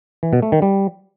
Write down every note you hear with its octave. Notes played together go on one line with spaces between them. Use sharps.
E3
B2
A3
D#3
G3